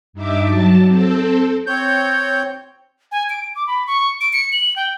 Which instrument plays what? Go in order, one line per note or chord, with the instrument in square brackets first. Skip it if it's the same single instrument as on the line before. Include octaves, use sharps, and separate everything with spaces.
[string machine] G2 D#4 E5 D6
F#3 A5
C4 A4
[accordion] C4 C#5 G6
[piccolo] G#5
D7
D6
B5
C#6
D7
C#7
F#7
G5